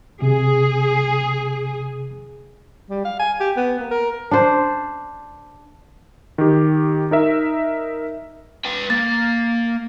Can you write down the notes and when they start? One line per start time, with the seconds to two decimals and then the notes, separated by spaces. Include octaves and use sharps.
0.22 C3 G#4
2.90 G3
3.05 F5
3.19 G#5
3.40 G4
3.56 B3
3.79 A#3
3.91 A#4
4.31 D4 C5
6.38 D#3 G4
7.11 D#4 A#4 E5
8.65 B4 G5
8.90 A#3 A6